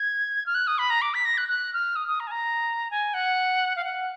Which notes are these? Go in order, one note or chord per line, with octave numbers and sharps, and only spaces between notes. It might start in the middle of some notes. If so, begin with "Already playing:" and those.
Already playing: G#6
F6
F#6
D#6
B5
A#5
D6
B6
A#6
F#6
F#6
F6
D#6
D#6
A#5
G#5
A#5
G#5
F#5
F5
F#5